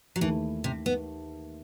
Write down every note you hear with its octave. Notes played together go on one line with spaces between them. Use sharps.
F#3
D#2 D#3 E3 A3 D#4
C3
B3